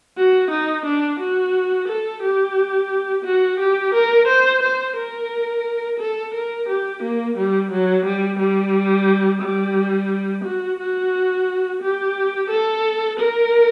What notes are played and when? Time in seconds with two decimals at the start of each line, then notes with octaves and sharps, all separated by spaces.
0.17 F#4
0.51 D#4
0.85 D4
1.20 F#4
1.88 A4
2.22 G4
3.25 F#4
3.60 G4
3.94 A#4
4.28 C5
4.63 C5
4.97 A#4
6.00 A4
6.34 A#4
6.68 G4
7.03 A#3
7.37 G3
7.71 F#3
8.05 G3
8.39 G3
9.42 G3
10.45 F#4
10.80 F#4
11.82 G4
12.50 A4
13.20 A#4